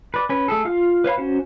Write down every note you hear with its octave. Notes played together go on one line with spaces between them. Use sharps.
B4 D5
C#4 B4
A3 G#4 A4
F4 F5 F6
B4 C#5 F5 B5
C#4 F#4 C5